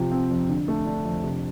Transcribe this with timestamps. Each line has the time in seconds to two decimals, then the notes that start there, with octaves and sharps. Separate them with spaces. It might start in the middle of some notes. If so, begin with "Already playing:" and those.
Already playing: C3 F3
0.12 C4
0.30 F2
0.49 D3
0.68 A3
0.86 D4
1.05 F2
1.23 C3